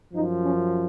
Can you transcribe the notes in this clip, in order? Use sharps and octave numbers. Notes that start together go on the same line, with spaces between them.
F#2 F3 D#4
C#4